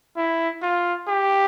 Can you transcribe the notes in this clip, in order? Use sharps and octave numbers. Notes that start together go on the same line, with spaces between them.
E4
F4
G4